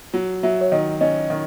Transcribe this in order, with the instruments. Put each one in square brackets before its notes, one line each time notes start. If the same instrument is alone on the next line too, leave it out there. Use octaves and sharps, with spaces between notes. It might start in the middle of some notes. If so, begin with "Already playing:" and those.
[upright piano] F#3
[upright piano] F#3 [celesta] E5
[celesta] C#5
[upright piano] D#3 [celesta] D#5
[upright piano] C#4 [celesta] D#5
[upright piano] D#3